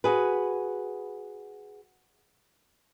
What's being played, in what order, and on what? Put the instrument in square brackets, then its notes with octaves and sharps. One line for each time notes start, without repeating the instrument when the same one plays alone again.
[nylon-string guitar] F#4 G#4 B4